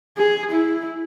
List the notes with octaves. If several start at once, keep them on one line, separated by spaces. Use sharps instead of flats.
G#4
E4